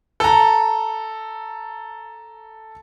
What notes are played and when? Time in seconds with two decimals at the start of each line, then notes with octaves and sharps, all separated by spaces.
0.20 A4 A#5